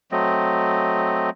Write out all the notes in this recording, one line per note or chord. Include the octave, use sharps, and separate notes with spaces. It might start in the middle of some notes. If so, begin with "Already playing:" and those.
F#3 A3 C4 D#5